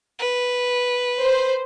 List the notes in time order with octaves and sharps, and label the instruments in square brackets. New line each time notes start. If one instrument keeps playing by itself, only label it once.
[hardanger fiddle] B4
[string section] C5